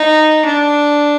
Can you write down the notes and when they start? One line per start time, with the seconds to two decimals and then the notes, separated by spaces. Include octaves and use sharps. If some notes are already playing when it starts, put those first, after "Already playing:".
Already playing: D#4
0.45 D4